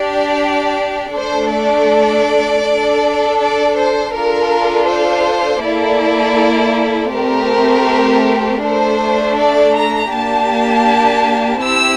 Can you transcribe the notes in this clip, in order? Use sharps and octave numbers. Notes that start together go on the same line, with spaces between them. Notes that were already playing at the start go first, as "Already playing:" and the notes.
Already playing: D4 G4 D5
A3 D4 A4 C5
D5
D4 A4
D5
C5
D4 F4 A4 A#4
C5
A#3 E4 A4 D5
A3 C4 G4 A#4
A3 D4 A4 C5
D5
A#5
A#3 D4 G4 A5
C4 E4 G4 E6